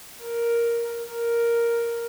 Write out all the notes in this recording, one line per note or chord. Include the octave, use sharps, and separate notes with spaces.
A#4
A#4